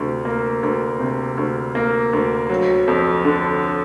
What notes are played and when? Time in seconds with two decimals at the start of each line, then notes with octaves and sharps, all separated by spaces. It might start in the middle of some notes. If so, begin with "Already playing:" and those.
Already playing: D2 C3
0.25 A#3
0.63 D2
1.00 C3
1.37 D2
1.75 A#3
2.13 D2
2.50 F#3
2.88 F2
3.24 D3